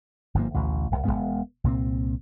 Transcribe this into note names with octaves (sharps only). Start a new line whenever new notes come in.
G1 G#2 F3 A#3
A1 D2 B2
D1 C2
E1 G2 G#3 B3
C2 A#2 G#3 C4